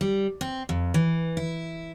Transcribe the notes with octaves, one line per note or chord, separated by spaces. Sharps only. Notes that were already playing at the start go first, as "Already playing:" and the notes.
G3
C4
F2
E3
E4